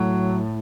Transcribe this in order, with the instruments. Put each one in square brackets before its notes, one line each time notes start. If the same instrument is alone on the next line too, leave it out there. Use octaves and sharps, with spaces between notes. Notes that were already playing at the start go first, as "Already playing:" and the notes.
Already playing: [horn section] A2 F#3